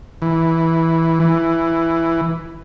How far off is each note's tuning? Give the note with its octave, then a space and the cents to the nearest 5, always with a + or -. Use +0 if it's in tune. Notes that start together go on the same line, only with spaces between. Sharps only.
E3 -5
E3 +10